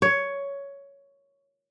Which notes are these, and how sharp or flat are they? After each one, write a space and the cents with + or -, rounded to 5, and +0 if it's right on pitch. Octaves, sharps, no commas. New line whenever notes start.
C#5 +10